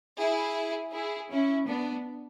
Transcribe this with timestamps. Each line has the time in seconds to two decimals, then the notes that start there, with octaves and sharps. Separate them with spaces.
0.20 E4 G#4
0.93 E4 G#4
1.30 C#4 E4
1.67 B3 D4